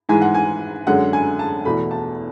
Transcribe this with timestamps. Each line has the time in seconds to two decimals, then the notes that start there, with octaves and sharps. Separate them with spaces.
0.09 G#2 E3 G#3 G#5
0.22 F#5
0.34 G#5
0.87 F#2 D3 G#3 F#5
1.13 G#5
1.39 A5
1.65 E2 B2 A3 B5
1.91 A5